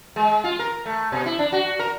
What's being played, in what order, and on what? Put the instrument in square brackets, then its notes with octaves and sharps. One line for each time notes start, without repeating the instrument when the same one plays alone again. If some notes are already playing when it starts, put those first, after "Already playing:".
[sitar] G#3
F4
A#4
A3
B2
E4
D4
F#4
A#4